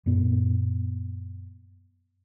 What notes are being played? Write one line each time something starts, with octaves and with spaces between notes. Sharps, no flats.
F#2 A#2 B3